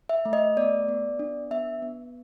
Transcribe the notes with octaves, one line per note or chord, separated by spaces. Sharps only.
E5
A3
D#5
B3 D5
B3
D4
B3 E5
B3